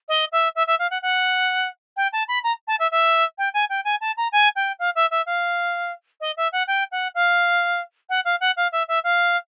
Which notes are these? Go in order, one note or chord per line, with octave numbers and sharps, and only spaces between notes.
D#5
E5
E5
E5
F5
F#5
F#5
G5
A5
B5
A#5
A5
E5
E5
G5
G#5
G5
G#5
A5
A#5
G#5
G5
F5
E5
E5
F5
D#5
E5
F#5
G5
F#5
F5
F#5
F5
F#5
F5
E5
E5
F5